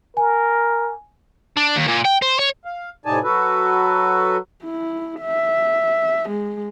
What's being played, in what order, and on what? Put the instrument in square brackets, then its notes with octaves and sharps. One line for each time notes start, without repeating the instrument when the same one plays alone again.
[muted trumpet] A#4 [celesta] G#5
[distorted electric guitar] D4
D#2
A#2
G5
C5
C#5
[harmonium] F5
A2 C3 D#4 D5 G#5 A5
F#3 F#4 A4 B4
[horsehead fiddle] E4
E5
G#3